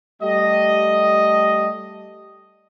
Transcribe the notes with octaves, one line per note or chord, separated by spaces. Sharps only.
G3 A3 G4 D#5